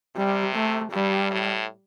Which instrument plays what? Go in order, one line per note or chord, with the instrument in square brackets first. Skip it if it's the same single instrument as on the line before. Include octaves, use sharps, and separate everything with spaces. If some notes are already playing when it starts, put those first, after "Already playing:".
[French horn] C3 [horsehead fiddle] G3
[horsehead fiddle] A3
[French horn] G2 [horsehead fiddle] G3
[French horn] A2